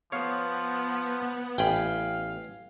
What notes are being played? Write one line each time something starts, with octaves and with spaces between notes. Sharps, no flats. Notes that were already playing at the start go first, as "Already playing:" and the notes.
F3 B3 C#5 F5
A1 F5 G5 G#5 B5